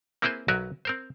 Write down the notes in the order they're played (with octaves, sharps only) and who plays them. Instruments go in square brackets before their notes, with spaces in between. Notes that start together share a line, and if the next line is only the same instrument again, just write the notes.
[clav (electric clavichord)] A#3 C4 E4 G#4 B4 C5
B1 F#3 F#4 A#4 B4 E5
C4 A#4 C5